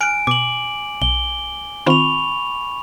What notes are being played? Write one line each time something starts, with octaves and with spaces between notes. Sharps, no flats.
G#5 F6 F#6 D7
B2 D6 F#7
B1 G7
D#3 C4 F4 B5 C#6 F7